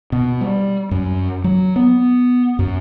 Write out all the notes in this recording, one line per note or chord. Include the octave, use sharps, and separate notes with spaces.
B2
G3
F#2
F#3
B3
F#2